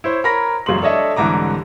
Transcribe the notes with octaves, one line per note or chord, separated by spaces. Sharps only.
E4 C5 C#5
A#4 C#5 A#5 B5 A#6
E1 F#2 C#3 A#3 C6 F#7
D4 A4 C#5 D#5 E5
C2 G#2 D3 E3 A#5 D6